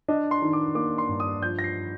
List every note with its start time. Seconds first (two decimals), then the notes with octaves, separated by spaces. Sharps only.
0.08 D4 D#5
0.31 C6
0.42 D#3
0.53 D6
0.75 A#3 D6
0.98 C6
1.09 G2
1.20 D#6
1.42 F3 G6
1.59 A#6
1.64 C7